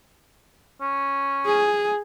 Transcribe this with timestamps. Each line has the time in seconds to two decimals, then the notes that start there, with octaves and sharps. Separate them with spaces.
0.81 C#4
1.46 G#4